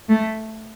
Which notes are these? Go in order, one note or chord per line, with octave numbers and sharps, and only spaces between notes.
A3